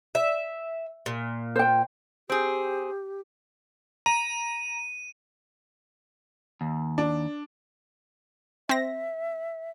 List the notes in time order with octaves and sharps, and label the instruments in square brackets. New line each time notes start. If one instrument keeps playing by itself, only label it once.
[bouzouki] E5
A#2
[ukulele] C5 G5
[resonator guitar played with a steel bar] C4 G#4 [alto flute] G4
[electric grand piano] A#5 [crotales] D#7
[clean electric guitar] D#2
[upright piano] D4
[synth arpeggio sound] C4 A#6 [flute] E5